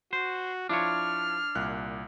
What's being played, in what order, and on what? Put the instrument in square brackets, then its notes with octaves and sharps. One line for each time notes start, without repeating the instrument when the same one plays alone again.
[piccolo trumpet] F#4 [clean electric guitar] C5
[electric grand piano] F3 E4 F4 [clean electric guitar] D4 C#5 [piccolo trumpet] F6
[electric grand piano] C2 A#2 F#6